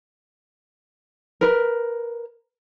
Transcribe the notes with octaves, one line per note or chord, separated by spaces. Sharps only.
A#4 B4